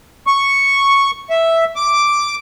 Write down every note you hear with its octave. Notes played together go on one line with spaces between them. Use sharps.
C#6
E5
D6